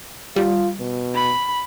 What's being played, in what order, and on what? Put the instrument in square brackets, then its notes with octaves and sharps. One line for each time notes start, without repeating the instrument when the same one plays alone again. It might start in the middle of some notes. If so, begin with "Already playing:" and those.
[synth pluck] G3 [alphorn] F4
[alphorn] B2
[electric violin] B5